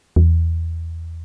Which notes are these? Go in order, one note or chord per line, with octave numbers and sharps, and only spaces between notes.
E2